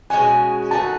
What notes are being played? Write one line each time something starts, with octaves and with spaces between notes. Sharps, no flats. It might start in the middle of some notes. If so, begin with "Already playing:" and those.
B2 G#3 C#4 F#4 G#5
D#3 A3 D#4 F#4 A5